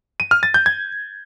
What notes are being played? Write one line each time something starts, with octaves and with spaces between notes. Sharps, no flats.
D#7
F6
A6
G6
G#6